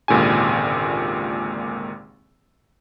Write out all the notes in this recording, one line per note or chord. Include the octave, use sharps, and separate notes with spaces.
G#1 C#2 A#2 D3 G4 G#5